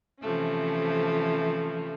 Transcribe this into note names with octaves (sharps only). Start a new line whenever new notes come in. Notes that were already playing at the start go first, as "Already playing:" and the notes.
C3 E3 F3 A3 C#4